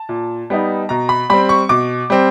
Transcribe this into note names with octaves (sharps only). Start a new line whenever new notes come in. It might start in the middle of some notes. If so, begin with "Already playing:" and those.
Already playing: A5
A#2
G3 B3 D#4
B2 A#5
B5
G3 C4 B5
C#6
B2 D6
G3 C4